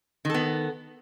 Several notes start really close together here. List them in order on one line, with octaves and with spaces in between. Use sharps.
D#3 A4 B3